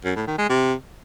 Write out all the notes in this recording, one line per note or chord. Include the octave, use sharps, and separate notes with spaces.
F#2
A2
D#3
G#3
C3